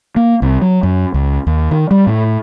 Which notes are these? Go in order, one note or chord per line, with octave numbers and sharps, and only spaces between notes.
A#3
C2
F#3
F#2
C#2
D#2
D#3
G3
A2